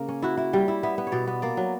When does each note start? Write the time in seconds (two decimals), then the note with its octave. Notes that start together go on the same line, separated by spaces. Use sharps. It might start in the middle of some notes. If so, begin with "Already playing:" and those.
Already playing: C#3 A#3
0.09 C#4
0.22 E4 F#4
0.37 E4
0.53 G3 G4
0.68 E4
0.83 B3 E5
0.98 B3
1.07 C#5
1.12 B2 D5
1.27 B3
1.42 A#3 D5
1.57 F#3